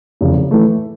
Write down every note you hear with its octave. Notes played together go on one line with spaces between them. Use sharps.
F1 E2 C#3
A2 E3 A3